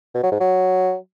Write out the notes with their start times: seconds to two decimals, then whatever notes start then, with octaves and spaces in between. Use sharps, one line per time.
0.15 B2
0.23 F#3
0.32 G#2
0.40 F#3